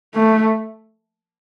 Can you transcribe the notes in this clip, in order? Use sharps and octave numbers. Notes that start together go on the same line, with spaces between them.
A3